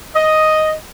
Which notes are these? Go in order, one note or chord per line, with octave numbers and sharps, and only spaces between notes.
D#5